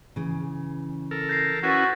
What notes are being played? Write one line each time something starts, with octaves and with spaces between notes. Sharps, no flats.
C#3 E3
A4 A#4
G6 A#6 C7
C#4 E4 F#4 B4 A6 A#6